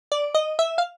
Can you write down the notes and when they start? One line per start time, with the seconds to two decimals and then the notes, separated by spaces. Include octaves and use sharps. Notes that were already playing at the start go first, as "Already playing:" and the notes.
0.12 D5
0.35 D#5
0.59 E5
0.78 F5